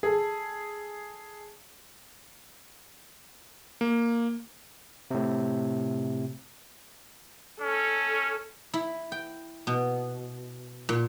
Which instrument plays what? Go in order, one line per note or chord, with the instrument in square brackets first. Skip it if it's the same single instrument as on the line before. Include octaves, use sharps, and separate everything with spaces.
[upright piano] G#4 A4
[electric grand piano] A#3
[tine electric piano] A2 C3
[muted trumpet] C#4 [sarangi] A4
[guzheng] E4
G5
B2
A#2